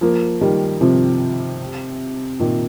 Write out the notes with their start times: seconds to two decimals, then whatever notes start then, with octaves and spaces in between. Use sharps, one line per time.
0.01 F3 A#3
0.41 D#3 G3
0.81 C3 F3
2.39 A#2 D#3